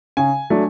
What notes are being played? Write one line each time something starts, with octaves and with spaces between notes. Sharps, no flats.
C#3 G#5
F#3 A3 D4